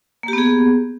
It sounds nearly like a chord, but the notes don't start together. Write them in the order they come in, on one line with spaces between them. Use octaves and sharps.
A#3 G4 B3 G#4